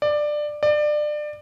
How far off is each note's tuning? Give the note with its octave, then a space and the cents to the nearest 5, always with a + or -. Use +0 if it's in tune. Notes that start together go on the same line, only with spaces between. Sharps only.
D5 +15
D5 +25